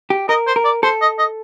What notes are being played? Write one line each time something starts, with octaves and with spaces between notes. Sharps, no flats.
G4
A#4 D#5
C5
A#4
D5
A4 C5
D#5
D#5